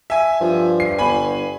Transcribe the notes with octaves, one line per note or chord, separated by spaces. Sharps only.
E5 G#5
G2 F3
C7
G1 G#5 B5